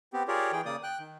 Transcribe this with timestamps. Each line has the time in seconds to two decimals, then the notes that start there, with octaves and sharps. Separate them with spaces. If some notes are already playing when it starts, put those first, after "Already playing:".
0.13 B3 C4 G4
0.28 F4 G4 G#4 A#4 C#5 D5
0.52 E3 G#4 G5
0.66 C#3 A#3 D5 D#6
0.83 G5 F#6
0.99 D#3